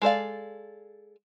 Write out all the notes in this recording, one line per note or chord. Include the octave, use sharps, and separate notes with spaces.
G#3 A4 D5 F5